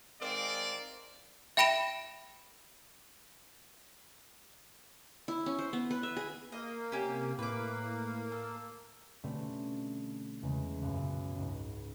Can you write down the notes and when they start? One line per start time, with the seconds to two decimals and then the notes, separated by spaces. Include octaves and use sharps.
0.21 D#3 G#3 C4 A#4 D5 F5
1.57 E5 G5 B5 A#6 D7 E7
5.28 E4
5.46 C#4
5.59 C5
5.73 B3
5.91 B4
6.03 E5
6.17 G#4
6.52 A#3 D#5
6.92 C3 C#4 G4
7.39 A2 A#3 B4 D6
8.32 A4
9.24 B2 D3 G3 A3 C4 C#4
10.43 E2 C#3 G#3
10.81 B1 F#2 A#2
11.35 C#2 G#2